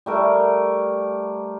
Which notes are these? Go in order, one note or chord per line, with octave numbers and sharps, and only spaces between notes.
G3 A3 A#4